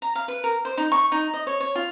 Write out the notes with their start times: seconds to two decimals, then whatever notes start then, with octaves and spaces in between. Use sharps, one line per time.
0.02 A#5
0.15 F5
0.28 B4
0.44 A#4
0.65 C5
0.78 D#4
0.92 C#6
1.12 D#4
1.34 D#5
1.47 C#5
1.60 C#5
1.76 F4